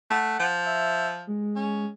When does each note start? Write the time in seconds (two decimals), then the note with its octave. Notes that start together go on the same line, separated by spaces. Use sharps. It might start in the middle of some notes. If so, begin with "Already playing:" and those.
0.10 A3 F#5
0.39 F3
0.65 E5
1.27 G#3
1.56 C#4